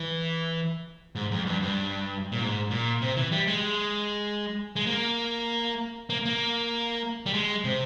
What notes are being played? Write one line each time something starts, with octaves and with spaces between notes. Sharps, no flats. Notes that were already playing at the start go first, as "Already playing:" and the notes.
Already playing: E3
G#2
F2
G2
G2
A#2
G#2
A#2
C3
E3
G3
G#3
G#3
A#3
A#3
A#3
G3
G#3
C3